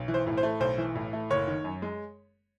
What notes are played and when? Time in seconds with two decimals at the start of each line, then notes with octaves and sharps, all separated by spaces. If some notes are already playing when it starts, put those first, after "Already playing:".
Already playing: B1
0.08 E3
0.14 C5
0.27 A2
0.38 C5
0.43 A3
0.60 B1 C5
0.78 E3
0.95 A2
1.13 A3
1.30 F#1 C#5
1.47 D#3
1.64 F#2
1.82 G#3